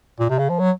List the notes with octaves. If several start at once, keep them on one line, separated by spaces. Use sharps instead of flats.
A#2
C3
C#3
F3
F#3